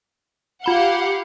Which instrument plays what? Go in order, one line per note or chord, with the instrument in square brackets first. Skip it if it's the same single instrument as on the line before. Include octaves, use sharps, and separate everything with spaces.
[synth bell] F4 B5 G7 [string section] G4 F5 F#5